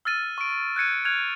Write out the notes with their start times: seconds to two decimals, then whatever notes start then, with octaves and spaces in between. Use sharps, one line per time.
0.05 E6 F6 A6 D#7
0.38 C#6 D7
0.76 F#6 G#6 C#7 D#7
1.05 F6 F#6 G#6 F7